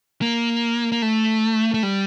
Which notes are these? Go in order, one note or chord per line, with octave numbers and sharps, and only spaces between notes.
A#3
A#3
A3
A3
G3